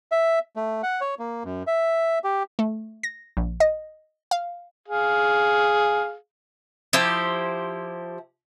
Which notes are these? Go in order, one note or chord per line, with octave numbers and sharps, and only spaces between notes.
E5
A3
F#5
C#5
A#3
F#2
E5
G4
A3
A#6
A#1
D#5
F5
G#4 F5
F3 E4 G4 C5